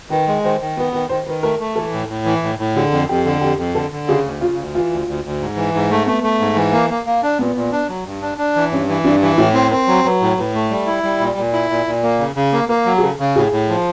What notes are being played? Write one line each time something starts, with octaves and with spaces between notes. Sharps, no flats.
D#3 B4
G#3
D#3 C5
D#3
B3 B4
D#3 B4
D#3 C5
D#3 B4
A3 A#4
A3
E3 A4
A2
A2
E3
A2
A2
D3 G#4
F2
F2 G4
D3
F2 G4
F2
D3 A4
D3
C#3 G#4
D2
C#3 F4
D2
E3 F4
D2
D2
D2
G#2
E3
G#2
A3
A3 B3
A3
G#2
E3
A#3
A#3
A#3
D4
A#2 B3
A#2
D4
F#3
G2
D4
D4
E3
G2 C#4
E3
G2 D4
E3
A2 E4
C4
C4 A#4
F#3
F#3 B4
A2
A2 B4
A3
G3
E4
G3
A#2
A#2
E4
A#2
A#2
A#3
C#3
C#3
A#3
A#3 A#4
F#3
G#4
C#3 A4
C#3
A2 G#4
A2
F3